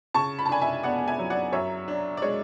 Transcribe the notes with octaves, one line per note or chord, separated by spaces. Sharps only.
C#3 A5 C#6
B5
A5
D4 G#5 B5
E5 G#5
B3 D5 F#5
E5 G#5
F#3
D5 F#5
F#2 C#5 E5
D4
D5
G#3 C#5